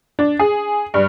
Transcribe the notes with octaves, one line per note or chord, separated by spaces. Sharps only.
D4
G#4
G2